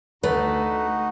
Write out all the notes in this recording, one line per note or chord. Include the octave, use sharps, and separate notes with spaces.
D2 A3 D#4 F#4 B4